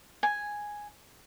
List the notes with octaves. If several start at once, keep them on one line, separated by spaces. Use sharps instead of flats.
G#5